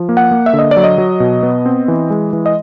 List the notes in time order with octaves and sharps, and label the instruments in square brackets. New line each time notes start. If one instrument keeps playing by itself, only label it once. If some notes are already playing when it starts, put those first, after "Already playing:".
Already playing: [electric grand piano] F3
A#3
F#5
A#3
E5
D3
D#5
D5
F#3
D#5
F#3
B2
B3
C4
E3
G#3
E3
D#5